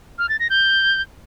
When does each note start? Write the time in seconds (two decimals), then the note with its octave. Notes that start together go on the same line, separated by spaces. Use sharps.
0.19 F6
0.29 A6
0.40 A#6
0.50 G6